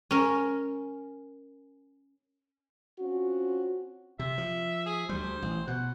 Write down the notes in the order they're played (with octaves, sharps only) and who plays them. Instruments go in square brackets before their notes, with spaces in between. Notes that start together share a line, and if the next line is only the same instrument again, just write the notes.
[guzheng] C#4 A#4
[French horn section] C4 C#4 F4 F#4
[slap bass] C3 [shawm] E5
[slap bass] F3
[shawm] G#4
[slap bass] D2 G3 [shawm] C5
[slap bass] A1
[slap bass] B2 [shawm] F#5